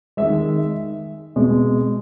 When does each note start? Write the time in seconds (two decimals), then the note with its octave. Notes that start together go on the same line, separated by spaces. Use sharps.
0.17 D#3 G#3 E5
1.36 B2 G#3